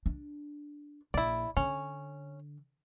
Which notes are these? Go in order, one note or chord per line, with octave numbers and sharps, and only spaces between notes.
D4
A#1 E4 D5
D3 C#4